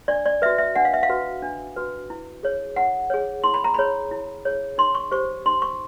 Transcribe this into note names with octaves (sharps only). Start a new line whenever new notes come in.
D4 D5
D5
F#4 B4 E5
E5
D4 F#5
F5
E5
F5
F#4 B4
D4
F#4 B4
E4
G#4 C#5
E4 F#5
G#4 C#5
E4 C6
B5
A#5
G#4 C#5 B5
E4
G#4 C#5
D#4 C6
C#6
G4 C5 C#6
D#4 C6
C#6